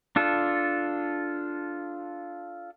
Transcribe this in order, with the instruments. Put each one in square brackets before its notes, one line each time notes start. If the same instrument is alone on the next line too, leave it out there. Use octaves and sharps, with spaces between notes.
[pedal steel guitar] D4 F4 A4